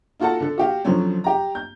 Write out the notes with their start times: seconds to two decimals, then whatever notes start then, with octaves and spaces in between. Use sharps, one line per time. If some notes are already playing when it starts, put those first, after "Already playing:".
0.20 D#4 F4 F#4 A4 F#5 A5
0.40 D3 A4
0.58 F#4 G4 F5
0.85 F2 D3 F3 F#3 C4 C#4
1.24 G4 A#5
1.55 G6